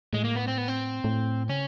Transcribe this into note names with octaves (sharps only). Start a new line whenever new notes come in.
A2 G#3
A#3
B3
C4
B3
C4
A2
C#3 C#4